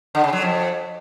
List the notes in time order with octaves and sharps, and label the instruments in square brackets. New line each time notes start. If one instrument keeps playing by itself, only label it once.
[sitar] D3
C#3
F#3
F2